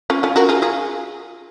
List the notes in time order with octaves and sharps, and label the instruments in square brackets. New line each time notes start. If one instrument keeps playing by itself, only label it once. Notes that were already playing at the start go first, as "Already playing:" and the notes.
[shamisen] C#4 F4
C#4 F4
F#4 A#4
F4 G#4
F4 G#4